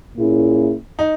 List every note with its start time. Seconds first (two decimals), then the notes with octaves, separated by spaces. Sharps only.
0.15 A#2 A#3 C#4 E4 G#4
0.99 D#4